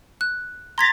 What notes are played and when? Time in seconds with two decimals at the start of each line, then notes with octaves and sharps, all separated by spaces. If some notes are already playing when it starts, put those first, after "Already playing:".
0.21 F#6
0.78 A#5 C6 G#6 A6 B6